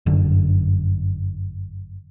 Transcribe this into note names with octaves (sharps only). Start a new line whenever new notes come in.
G1 F#2 D3